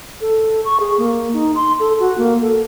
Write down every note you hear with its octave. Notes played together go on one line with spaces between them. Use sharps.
A4
C#6
G#4
A#3
D#4
C6
A4
F#4
A#3
A4